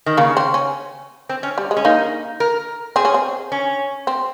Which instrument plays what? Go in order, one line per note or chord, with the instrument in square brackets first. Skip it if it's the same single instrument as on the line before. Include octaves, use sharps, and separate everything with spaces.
[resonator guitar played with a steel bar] D#3
[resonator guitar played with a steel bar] C#3 [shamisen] A#3
[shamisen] C4
C#4
[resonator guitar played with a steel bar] C4
C#4
[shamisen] G3
G#3
[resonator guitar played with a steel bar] C#4
[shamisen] A#3 [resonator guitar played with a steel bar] D#4
[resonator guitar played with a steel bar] A#4
[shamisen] C4 [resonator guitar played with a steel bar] G#4
[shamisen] C#4
C4
[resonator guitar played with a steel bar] C#4
[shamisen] C4